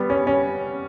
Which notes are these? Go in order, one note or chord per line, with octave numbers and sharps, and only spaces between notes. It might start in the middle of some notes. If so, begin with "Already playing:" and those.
Already playing: G3 B3
C#4
C#4